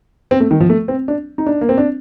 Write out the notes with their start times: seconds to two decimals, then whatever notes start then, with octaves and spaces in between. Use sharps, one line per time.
0.31 C4
0.40 A3
0.51 D#3
0.60 F3
0.69 A3
0.88 C4
1.08 D4
1.38 D#4
1.46 D4
1.61 A#3
1.69 C4
1.78 D4